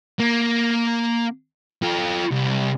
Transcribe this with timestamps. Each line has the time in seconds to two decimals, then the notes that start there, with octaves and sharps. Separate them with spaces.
0.20 A#3
1.83 F4 A4
2.31 C2